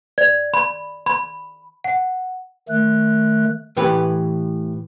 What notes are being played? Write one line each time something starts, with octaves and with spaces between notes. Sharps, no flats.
D5
B5
B5
F#5
D#3 A3 F#6
A2 E3 G4 B4